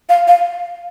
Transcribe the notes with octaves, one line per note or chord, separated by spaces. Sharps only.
F5
F5